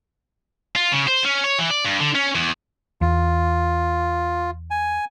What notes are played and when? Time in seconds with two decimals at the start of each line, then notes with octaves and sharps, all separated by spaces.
0.76 F4
0.93 C#3
1.08 C5
1.25 C#4
1.44 C#5
1.59 E3
1.71 D5
1.85 G2
2.00 D3
2.15 C#4
2.35 E2
3.01 E2 F4
4.70 G#5